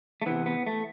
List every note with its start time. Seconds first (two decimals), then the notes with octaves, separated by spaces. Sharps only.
0.22 A3
0.26 C3 E3 B3
0.46 B3
0.67 A3